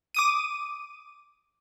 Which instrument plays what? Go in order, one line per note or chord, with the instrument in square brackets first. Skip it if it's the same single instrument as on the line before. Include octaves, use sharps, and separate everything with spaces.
[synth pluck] D6 D#6 D#7